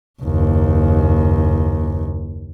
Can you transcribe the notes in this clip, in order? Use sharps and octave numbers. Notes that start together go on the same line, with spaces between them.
F#1 D#2